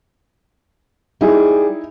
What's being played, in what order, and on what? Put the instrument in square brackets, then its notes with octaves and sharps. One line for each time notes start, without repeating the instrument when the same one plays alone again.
[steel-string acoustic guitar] G3 G#4 [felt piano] D#4 E4